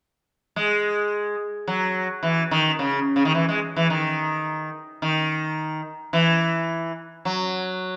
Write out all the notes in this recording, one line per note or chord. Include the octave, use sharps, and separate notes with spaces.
G#3
F#3
E3
D#3
C#3
C#3
D#3
E3
G#3
E3
D#3
D#3
E3
F#3